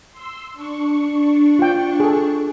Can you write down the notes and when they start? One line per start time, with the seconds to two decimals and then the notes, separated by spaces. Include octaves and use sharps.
0.11 C6 E6
0.54 D4 C#6
1.59 F4 G5
2.00 G#4 A4